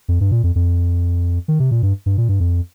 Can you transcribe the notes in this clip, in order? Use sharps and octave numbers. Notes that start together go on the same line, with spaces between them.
F2
G2
A#2
F2
F2
D#3
C3
A#2
G2
G2
A#2
G2
F2